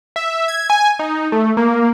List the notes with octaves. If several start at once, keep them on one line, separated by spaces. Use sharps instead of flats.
E5
G#6
G#5
D#4
A3
A#3